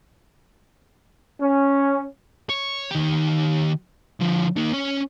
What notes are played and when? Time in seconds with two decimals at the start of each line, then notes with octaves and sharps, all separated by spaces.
1.41 C#4
2.50 C#5
2.91 D#3 G4
4.21 D3 F3
4.56 A#3 D#4
4.73 C#4 C#5